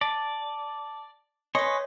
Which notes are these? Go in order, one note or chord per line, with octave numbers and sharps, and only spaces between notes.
D5 A5
B4 C#5 D#5 G#5 C6 C#6